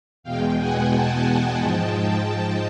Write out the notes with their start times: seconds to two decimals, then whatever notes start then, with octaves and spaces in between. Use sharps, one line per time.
0.23 E2 B2 G#3 F5 G5
0.57 F#5 G#5
0.91 G5 A5
1.59 G#2 F3 G#3 G5 A5